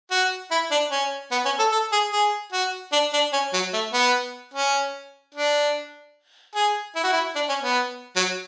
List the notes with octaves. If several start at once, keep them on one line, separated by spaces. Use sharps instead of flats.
F#4
E4
D4
C#4
B3
C#4
A4
A4
G#4
G#4
F#4
D4
D4
C#4
F#3
A3
B3
C#4
D4
G#4
E4
F#4
E4
D4
C#4
B3
F#3